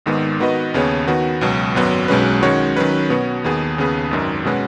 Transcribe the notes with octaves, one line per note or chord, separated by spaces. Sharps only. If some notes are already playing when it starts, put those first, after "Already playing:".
G#1 G#2 D#3 B3
D#3 B3 F#4 B4 D#5
D#2 C#3 B3 G#4 C#5
D#3 B3 F#4
C#2 B2 F#3
G#1 F#2 F#3 B3
B1 B2 G#3 C#4 B4
D#3 G#3 C#4 F#4 C#5
D#3 F#3 C#4 B4
B2 B3 F#4 C#5
D#2 D#3 B3 G#4
D#2 C#3 B3 G#4 B4
G#1 F#2 D#3
B2 G#3 C#4 F#4 B4